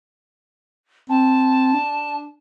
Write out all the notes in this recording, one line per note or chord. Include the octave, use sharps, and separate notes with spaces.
C4 A5
D4